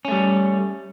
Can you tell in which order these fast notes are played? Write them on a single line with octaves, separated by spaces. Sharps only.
C#4 A3 G3